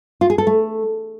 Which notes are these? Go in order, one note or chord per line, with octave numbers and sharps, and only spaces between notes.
F4
G#4
A4
A3